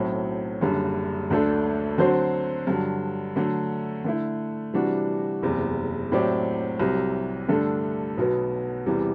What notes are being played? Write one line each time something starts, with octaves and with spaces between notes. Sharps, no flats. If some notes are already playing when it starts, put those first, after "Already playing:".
Already playing: B1 A2 F#3 C4
F#1 F#2 D3 G3
D2 D3 A3 D4 A4
D3 F#3 C4 F#4 C5
G2 D3 F#3
D3 F#3 A3
D3 A3 E4
C3 E3 G3 D4 F#4
F#1 E2 C3
A2 F#3 C4 G4 D5
C2 C3 F#3
G2 D3 A3 D4 A4
B1 B2 F#3 B3
E2 C3 E3 G3